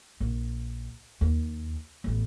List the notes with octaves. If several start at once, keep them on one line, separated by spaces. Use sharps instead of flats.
A#1
D#2
A1 B3